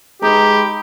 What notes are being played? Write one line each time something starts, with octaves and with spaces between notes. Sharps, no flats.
G#3 D#4 G4 B4